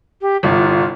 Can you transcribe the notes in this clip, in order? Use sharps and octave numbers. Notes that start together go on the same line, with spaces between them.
G4
G1 C2 F4